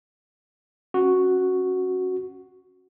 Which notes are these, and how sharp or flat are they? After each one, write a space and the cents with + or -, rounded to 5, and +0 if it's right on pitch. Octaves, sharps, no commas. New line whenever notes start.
C#4 -20 F#4 +0